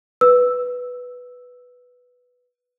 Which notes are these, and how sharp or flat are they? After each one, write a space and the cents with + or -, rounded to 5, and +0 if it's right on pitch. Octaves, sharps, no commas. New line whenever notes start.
B4 +0 E6 +0